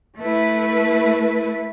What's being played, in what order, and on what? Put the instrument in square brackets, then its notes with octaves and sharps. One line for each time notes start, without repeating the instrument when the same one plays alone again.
[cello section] A3 E4 B4